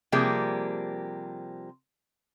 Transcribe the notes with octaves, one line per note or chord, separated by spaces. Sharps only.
C3 F3 G3 A#3 G#4